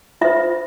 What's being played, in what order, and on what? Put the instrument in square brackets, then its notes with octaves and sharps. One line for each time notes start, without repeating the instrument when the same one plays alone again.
[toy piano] F4 C5 E5